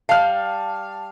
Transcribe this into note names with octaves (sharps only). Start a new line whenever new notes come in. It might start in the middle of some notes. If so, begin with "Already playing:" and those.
G3 F5 A5 F6